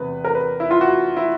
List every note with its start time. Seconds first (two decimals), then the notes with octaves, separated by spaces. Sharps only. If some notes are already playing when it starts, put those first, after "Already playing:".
Already playing: E2 C3 B4
0.25 A#4
0.35 B4
0.60 E4
0.71 F4
0.81 F#4
1.16 E4